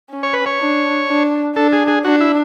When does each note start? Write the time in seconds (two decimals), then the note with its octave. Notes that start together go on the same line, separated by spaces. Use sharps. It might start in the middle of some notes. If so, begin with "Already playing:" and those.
0.10 C#4
0.23 C#5
0.33 B4
0.46 C#5
0.59 D4
1.08 D4
1.56 D4 A4
1.73 G#4
1.88 G#4
2.05 D4 F#4
2.21 E4